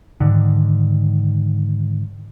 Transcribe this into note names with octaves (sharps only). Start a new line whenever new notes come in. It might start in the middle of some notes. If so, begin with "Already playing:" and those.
G#2 D3 D#3